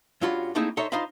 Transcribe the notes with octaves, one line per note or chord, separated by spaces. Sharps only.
G2 C#4 F4 F#4 B5
A3 A#3 C4 D#4 E4 G#4
D#4 A4 C5 C#5 D#5 E5
D#4 F4 C5 D#5 F5 B5